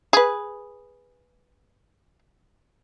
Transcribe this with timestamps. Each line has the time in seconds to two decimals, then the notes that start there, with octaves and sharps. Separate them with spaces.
0.13 G#4 B4